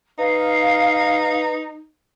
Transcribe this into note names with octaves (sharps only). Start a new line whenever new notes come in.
D#4 B4 F5